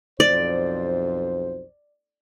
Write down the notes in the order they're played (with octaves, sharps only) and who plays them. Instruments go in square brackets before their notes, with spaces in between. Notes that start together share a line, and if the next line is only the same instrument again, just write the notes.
[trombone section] B1 F2 C5 [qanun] D5